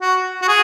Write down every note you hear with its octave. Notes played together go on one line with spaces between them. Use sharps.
F#4
F#4
G#4